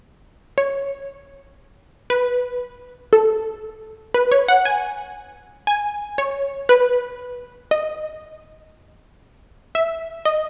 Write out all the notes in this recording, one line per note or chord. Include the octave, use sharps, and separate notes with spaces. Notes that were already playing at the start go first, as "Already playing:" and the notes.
C#5
B4
A4
B4
C#5
F#5
G#5
G#5
C#5
B4
D#5
E5
D#5